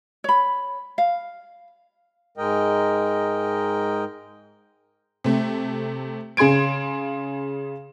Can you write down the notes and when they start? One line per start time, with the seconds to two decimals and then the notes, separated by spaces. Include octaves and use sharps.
0.24 C#5 B5
0.98 F5
2.38 G#2 G#3 A#4 D#5 G5
5.24 C3 A3
6.37 C#3 G#4 C6 G#6 D7